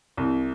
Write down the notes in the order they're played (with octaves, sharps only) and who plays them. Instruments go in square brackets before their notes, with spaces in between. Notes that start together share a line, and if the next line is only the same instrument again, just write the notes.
[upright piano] C2